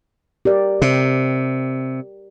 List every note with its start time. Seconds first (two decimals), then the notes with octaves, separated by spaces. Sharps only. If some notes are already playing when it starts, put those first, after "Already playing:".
0.45 G4 A#4 D5
0.82 C3